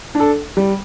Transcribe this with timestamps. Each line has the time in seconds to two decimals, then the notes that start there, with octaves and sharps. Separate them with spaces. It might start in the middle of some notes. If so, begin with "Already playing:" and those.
0.15 D4
0.20 A4
0.57 G3